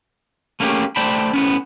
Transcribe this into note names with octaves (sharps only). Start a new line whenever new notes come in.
A3 A#3 C#4 D4 G4 G#4
A3 C5 D5 G5 A5 B5
A2 B3 C#4